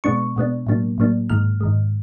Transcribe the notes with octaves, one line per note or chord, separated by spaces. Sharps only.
B2 G#3 B3 D4 C#6
B2 G#3 B3 D4
A2 F#3 A#3 D4
A2 F#3 A#3 D4
G#2 D#3 G#3 F6
G#2 D#3 G#3